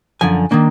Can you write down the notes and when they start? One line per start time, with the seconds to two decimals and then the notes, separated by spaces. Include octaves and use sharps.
0.21 F#2 D3 F3 G#5
0.51 D#3 A#3 D4